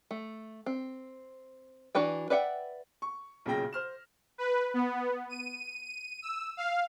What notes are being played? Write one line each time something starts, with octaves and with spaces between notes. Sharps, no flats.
A3
C4
E3 D4 F#4 B4 G5
B4 D5 E5 F#5 G5
C#6
B1 A#2 C#3 G5 A#6
C5 F6 E7
B4
B3
D#7
D#7
E6
F5